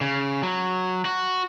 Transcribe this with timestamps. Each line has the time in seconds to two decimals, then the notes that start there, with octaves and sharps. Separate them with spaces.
0.01 C#3
0.43 F#3
1.05 F#4